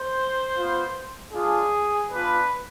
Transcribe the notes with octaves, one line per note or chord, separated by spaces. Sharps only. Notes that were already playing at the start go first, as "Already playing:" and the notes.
Already playing: C5
B3 F4
G#3 D4 F4 G#4
B3 D4 F4 B4